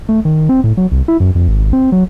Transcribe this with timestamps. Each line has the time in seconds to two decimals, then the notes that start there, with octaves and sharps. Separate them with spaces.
0.09 A3
0.25 D#3
0.49 C4
0.64 A2
0.77 F#3
0.92 C2
1.08 E4
1.20 F#2
1.35 F2
1.48 G#1
1.73 C4
1.92 F#3